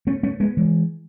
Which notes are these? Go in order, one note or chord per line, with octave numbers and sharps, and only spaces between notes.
A3 C#4
A3 C#4
G#3 B3
E3 G#3